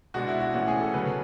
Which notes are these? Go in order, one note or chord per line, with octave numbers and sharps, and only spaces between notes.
B2 G#3 D4 F#4
E4
F#4
A2 E3 A3 C#4 F#4
G#4
A4
C#3 F#3 B3 B4